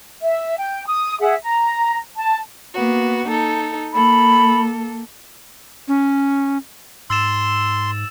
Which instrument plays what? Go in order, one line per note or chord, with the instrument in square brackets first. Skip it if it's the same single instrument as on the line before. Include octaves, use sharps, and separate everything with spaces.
[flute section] E5
G5
D#6
G#4 E5 F#5
A#5
A5
[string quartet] A#3 B3 F#4
D#4 A4
[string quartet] A#3 A4 [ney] B5
[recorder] C#4
[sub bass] G#2 [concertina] C6 [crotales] E6 A6 E7